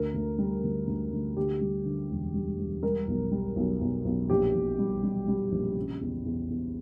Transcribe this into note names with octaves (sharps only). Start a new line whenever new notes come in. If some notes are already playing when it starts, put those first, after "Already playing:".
Already playing: D2 A#4
D2
G3
D2
D2
D2
D2 G4
G3
D3
E1
G3
E1
G3 A#4
B1
G3
B1
B1
B1
A#1 G4
A#1
G3
G3
G3
A#1
C#3
E2
E2
E2